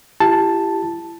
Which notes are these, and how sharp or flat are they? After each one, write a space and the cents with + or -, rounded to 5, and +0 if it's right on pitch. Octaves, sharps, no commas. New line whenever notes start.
E4 +35 G4 +0 A5 +0